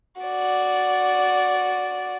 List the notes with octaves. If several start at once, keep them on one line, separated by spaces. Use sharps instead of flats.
F#4 D5